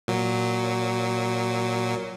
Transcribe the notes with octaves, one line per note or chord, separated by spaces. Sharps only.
A#2 F#3